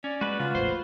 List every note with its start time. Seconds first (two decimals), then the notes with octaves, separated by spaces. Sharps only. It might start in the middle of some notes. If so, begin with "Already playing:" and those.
0.04 C#4 D5
0.21 G#3 F#4 B4
0.39 C#3 G#3 F4
0.55 A#1 E2 A2 C5